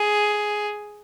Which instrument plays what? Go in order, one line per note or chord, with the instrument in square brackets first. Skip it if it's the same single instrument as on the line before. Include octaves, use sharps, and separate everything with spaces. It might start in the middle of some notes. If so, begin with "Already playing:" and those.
Already playing: [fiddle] G#4